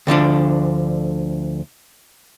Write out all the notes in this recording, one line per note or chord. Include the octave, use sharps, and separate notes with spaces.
D2 D3 F3 D4